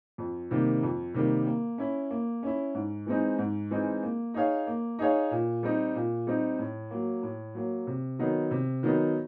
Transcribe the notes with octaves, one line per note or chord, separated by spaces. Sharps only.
F2
C3 D#3 G3 A#3
F2
C3 D#3 G3 A#3
A#3
C#4 E4
A#3
C#4 E4
G#2
E3 G#3 C4 D#4
G#2
E3 G#3 C4 D#4
A#3
D#4 G#4 C#5 F5
A#3
D#4 G#4 C#5 F5
A#2
G3 C4 D#4
A#2
G3 C4 D#4
A2
F#3 A#3
A2
F#3 A#3
C3
D#3 F#3 B3 D#4
C3
D#3 F#3 B3 D#4